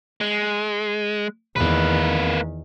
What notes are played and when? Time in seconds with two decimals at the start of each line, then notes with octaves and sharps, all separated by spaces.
0.21 G#3
1.56 E2 D#3 A#3 B4